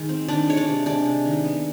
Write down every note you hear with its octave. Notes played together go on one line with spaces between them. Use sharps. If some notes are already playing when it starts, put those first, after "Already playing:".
Already playing: D#3 G#3
C4
D#3 D4 D5
G#3 C#5
D4 D5
C3
G#3 D4 D5
C3
D#3
B3